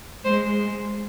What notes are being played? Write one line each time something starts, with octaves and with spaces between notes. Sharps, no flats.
G#3 C5